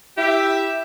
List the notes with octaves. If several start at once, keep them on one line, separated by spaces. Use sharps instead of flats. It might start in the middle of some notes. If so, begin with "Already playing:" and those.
E4 G4 E5